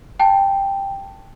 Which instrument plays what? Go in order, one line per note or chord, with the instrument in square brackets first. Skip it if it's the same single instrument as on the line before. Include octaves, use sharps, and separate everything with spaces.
[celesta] G5 A5